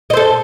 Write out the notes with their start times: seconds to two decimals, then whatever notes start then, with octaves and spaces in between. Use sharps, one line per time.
0.10 D#5
0.13 C5
0.17 A4